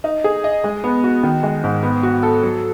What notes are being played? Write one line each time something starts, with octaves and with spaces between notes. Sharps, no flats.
D#4
G#4
D#5
G#3
B3
F#4
D#3
G#3
G#2
B3
F#4
A4
F#3